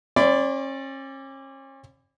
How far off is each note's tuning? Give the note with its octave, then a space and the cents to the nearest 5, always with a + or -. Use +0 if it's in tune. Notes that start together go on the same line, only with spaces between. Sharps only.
C#4 -40 D5 -5 B5 +40